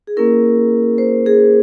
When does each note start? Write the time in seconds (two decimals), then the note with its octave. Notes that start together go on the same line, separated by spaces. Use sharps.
0.07 G#4
0.17 A#3 C#4 E4 A#4
0.98 C5
1.26 G#4